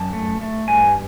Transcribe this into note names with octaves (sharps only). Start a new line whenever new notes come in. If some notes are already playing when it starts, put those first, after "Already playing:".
Already playing: F#2 A5
A3
A3
G2 G#5